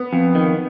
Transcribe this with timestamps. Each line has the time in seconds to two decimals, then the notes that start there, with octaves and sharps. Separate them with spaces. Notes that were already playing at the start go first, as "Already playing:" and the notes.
Already playing: B3
0.13 F2
0.35 D#3